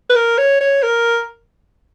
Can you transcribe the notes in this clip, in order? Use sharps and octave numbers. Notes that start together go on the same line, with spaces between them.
B4
A#4
C#5
C#5
A#4